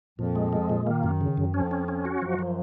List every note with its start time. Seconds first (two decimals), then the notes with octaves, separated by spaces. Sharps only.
0.19 F2 A#2 F3
0.35 G#3
0.53 G#3
0.69 A#2
0.87 D#3 A#3
1.03 F#2
1.21 C#3
1.37 F#2
1.54 F2 F3 C#4
1.71 C#4
1.88 C#4
2.05 F#4
2.22 F#2 F3 F#3
2.39 F3